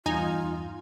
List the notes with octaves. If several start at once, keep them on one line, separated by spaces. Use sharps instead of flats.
E2 G2 D#4 F4 G#5